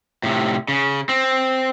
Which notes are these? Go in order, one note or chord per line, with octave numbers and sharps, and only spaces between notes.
A2 C3
C#3
C4